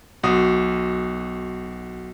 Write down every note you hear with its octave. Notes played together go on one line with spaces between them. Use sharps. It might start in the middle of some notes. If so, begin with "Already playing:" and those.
B1 F#4 D#6